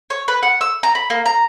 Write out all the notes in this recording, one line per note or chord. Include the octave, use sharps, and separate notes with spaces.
C#5
B4
F#5
E6
A#5
B5
A#3
A#5